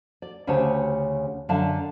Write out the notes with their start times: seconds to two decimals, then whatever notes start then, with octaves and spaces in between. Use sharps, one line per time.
0.22 D5
0.47 D2 C#3 G4 C5 C#5 A5
1.49 F#2 D3 D5 E5 F5 A5